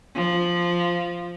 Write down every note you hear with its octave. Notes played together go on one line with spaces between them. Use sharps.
F3